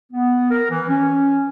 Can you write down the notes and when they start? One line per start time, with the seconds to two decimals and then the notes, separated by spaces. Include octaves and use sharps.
0.12 B3
0.51 A#4
0.70 E3
0.89 C#4